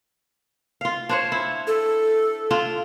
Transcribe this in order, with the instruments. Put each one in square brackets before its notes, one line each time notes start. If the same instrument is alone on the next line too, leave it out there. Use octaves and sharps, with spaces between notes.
[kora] F4 F5
D4 C5 C#5
E4
[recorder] A4
[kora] D4 F4